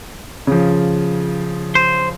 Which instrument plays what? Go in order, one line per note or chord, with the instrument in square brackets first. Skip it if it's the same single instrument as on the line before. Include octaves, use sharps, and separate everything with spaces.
[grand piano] C#3 F3
[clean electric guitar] C5